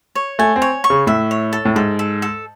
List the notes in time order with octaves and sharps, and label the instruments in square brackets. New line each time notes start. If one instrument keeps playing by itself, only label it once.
[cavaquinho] C#5
[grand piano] A3 [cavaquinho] G#5
[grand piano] C4
[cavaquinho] C#5
C#6
[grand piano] C#3
[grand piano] A2 [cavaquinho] E5
[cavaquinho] C#5
A4
[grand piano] A2
[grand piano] G#2 [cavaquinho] A4
[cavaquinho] A4
A4